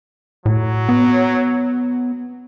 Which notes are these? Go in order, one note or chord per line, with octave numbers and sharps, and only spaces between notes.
A2 F#3
B3